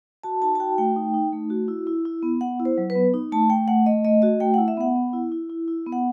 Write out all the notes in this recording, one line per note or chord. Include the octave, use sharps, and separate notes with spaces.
F#4 A5
D#4 A5
A5
F#4 G5
A3 G5
D#4
D#4
A3
F#4
E4
E4
E4
B3
B3 F#5
E4
C5
F#3
B4
B3
D#4
A3 A5
A3 G5
A3 F#5
A3 D#5
A3 D#5
F#4 D#5
A3 G5
E4 F#5
E5
B3 F#5
B3
E4
E4
E4
E4
B3
F#5